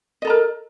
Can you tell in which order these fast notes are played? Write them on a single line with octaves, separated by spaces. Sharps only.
D#5 A4 A#5 A#4